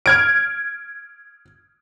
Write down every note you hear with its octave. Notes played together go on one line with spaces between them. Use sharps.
F6 G#6 D7